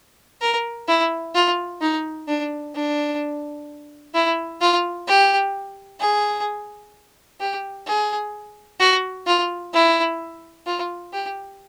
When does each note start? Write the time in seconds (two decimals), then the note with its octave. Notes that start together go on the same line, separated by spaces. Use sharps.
0.41 A#4
0.88 E4
1.35 F4
1.81 D#4
2.28 D4
2.75 D4
4.14 E4
4.61 F4
5.07 G4
6.00 G#4
7.40 G4
7.87 G#4
8.80 F#4
9.27 F4
9.74 E4
10.67 F4
11.13 G4